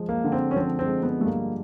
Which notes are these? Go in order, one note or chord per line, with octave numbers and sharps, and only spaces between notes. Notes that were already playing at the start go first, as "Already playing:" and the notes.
Already playing: F3 G#3
A#3
D3
C4
C#4
F3 C4
C4
G#3
B3
G2 A3
A#3